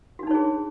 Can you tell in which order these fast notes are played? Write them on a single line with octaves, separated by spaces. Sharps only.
F#4 D4 D#4 C#5 G#4